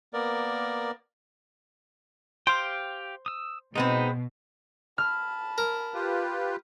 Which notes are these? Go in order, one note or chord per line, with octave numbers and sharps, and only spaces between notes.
A#3 B3 A#4 D5
G4 C5 F5 G5
D#6 E6
B2 G#3 B3 C4 D#4
A5 B5 F6
A#4
F4 G4 B4